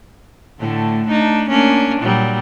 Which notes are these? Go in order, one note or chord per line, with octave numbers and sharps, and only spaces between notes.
A2 D3 A3
A3 D4 D#4
A#3 C#4 D4
A#2 F#3 G3